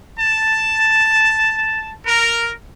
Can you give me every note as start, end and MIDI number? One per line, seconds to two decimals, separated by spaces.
0.19 1.93 81
2.05 2.50 70